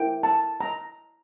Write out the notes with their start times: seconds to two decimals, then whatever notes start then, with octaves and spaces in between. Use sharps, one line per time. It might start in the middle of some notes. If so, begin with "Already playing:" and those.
Already playing: E4 A#4 G5
0.23 A5
0.61 A#5